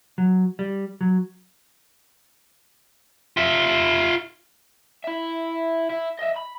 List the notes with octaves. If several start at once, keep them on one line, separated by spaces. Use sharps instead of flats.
F#3
G3
F#3
F4 E5
E4 E5
E4
D#5 E5
B5